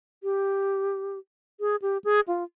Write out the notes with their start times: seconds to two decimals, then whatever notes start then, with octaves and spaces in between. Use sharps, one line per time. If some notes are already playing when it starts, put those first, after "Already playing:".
0.23 G4
1.60 G#4
1.82 G4
2.04 G#4
2.28 F4